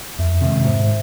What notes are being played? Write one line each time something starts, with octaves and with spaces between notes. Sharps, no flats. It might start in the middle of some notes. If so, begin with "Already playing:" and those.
F2 E5
C3 D#3 G#3 E5
G#2 C5